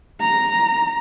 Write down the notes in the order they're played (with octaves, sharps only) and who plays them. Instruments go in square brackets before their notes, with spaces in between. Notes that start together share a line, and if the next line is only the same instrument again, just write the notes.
[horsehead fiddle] A#5